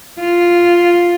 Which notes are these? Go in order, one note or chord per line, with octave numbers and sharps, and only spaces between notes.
F4